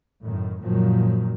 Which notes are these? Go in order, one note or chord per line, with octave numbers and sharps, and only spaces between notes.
F#2 A2 D#3
F#2 A#2 D#3 F3 F#3